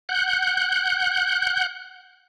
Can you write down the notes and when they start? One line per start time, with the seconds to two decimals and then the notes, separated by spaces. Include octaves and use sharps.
0.09 F#5 F#6 G6